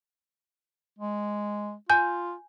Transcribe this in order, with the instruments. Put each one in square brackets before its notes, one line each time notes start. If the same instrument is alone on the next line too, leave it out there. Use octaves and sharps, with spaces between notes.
[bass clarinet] G#3
[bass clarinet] F4 [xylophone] G#5 G6